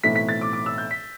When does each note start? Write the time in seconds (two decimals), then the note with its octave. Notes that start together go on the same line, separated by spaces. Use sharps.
0.04 B1 A2 E3 A3 C4 B6
0.16 B6
0.29 A6
0.41 D6
0.53 D6
0.66 E6
0.78 G6
0.91 B6